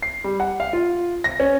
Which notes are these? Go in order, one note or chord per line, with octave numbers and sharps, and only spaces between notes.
C7
G3
F#5
F5
F4
A#6
C#4